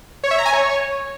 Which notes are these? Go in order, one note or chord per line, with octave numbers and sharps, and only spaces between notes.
C#5
E5
A#5
G#5
C#5